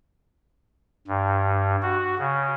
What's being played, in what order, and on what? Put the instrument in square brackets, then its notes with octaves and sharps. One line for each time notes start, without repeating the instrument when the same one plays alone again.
[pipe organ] G2
F#4
C#3